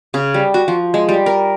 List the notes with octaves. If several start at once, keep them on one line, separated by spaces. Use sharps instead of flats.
C#3
G3
F#4
F3
G#3
G3
A#4